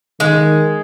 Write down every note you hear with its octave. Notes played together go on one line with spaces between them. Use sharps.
D#3 G#3